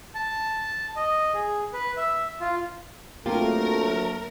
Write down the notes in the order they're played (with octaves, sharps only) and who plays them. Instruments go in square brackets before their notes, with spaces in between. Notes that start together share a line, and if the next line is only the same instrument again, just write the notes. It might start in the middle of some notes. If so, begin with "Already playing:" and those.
[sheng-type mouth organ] A5
D#5
G#4
B4
E5
F4
[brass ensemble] D2 F#3 A3 [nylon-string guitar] A#3 [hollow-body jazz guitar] C4 F4 G4 [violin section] A#4